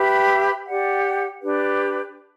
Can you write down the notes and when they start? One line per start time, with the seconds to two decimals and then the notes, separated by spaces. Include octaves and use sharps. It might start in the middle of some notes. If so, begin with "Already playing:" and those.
Already playing: G4 B4 E5 B5
0.66 G4 D5 F#5
1.41 D4 G4 B4